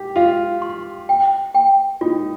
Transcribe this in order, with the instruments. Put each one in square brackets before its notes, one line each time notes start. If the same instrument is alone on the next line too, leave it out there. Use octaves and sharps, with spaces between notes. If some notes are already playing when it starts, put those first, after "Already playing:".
Already playing: [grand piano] G4
[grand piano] F4 [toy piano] F5
[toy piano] C6
G5
G5
[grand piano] D#4 [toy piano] F4